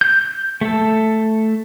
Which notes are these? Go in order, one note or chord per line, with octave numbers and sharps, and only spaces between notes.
G6
A3 A4